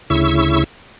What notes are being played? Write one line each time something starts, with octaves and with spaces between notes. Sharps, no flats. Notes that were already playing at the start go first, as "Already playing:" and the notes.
D2 C#3 E4 C#6 E6